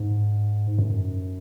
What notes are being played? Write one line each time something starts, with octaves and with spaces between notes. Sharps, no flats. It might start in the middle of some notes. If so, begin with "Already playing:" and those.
Already playing: G#2
F#2